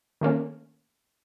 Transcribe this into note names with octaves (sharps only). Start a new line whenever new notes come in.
D#3 A3 A#3 C#4